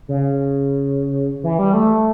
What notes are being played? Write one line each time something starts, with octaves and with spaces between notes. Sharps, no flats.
C#3
E3
G3
A3